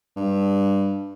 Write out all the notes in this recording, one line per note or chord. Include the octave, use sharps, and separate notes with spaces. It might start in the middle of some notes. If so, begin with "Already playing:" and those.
G2